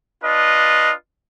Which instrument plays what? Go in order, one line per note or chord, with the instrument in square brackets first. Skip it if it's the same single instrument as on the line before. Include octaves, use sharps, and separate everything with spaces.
[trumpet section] D4 F4 B4 D#5